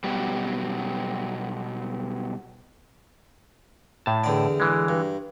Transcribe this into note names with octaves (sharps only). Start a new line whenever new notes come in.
B2 F#3 G3
A2 A5
E2 D3 D5
E3 G#3
G2